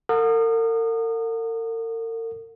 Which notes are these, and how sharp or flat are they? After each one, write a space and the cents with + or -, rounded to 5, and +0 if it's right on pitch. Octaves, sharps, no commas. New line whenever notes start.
A#4 -45 F#5 -35 D#6 -30